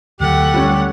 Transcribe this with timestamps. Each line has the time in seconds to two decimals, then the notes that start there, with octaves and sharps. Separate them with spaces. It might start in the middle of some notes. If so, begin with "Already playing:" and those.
0.20 D2 D3 F#3 A3 G4 F#5
0.54 G3 C#4